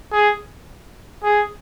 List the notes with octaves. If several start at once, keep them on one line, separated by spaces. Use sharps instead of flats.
G#4
G#4